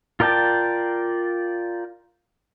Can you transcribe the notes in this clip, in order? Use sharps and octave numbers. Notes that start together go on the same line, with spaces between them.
F4 A#4 D5 G5 A5